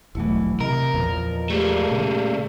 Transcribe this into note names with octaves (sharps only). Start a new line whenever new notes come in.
E1 A#1 E3 F#3 A3 E4
C3 A#4 D#5
E2 A#2 F3
A3 A#3 G4 G#4 D5
A#2 C#3